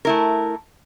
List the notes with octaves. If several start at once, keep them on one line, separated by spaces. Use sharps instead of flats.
A3 E4 A#4